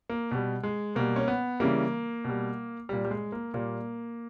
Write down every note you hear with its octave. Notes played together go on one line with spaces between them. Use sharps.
A#3
B2 G3
G#3
B2 G3 A#3
C#4
B3
C#3 E3 G3 A#3
B2 G3
A#2 G3
G3
G#3
A#3
A#2 G3 A#3